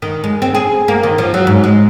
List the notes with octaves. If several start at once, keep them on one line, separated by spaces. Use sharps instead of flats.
D#3
G#3
C4
G#4
A#3
D#3
F3
F#3
G#2
G#3